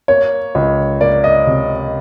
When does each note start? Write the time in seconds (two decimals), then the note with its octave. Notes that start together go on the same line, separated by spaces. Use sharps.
0.08 A#3 C#5
0.55 C#2
1.01 A#3 D5
1.24 D#5
1.47 C3